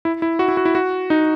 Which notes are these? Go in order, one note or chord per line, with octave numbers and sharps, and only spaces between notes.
E4
E4
F#4
E4
F#4
E4
F#4
D#4